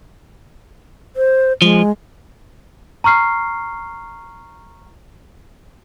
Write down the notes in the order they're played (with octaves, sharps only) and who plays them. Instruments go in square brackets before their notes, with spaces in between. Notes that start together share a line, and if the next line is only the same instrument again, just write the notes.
[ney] C5
[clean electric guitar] F3 [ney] G#3
[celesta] A#5 C#6 F6 C7